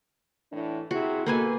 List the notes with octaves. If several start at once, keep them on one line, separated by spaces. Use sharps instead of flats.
A2 E3 D4
C3 E4 F#4 G#4
B2 A#3 A4 B4 G#5